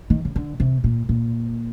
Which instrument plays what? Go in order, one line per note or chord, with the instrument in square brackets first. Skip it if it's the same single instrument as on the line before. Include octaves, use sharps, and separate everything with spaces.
[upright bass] D#3
C#3
D3
C3
A#2
A#2